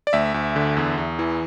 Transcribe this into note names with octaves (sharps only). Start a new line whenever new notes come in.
D5
D2 E5
D2
D3
E2
E2
E3